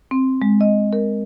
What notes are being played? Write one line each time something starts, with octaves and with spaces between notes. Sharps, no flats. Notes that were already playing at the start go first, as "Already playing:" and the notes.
C4
G#3
D#5
A#4